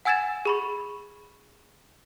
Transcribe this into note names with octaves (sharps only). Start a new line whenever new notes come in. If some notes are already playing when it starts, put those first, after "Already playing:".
F#5 G#5 E6 G#6 A6 E7
G#4 B5 C#6